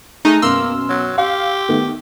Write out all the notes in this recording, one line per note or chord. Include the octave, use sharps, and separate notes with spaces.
G#3 A3 D#4
F#2 B2 A#3 C6 E6 F6
F#3
G4 F5
D#3 A3 B3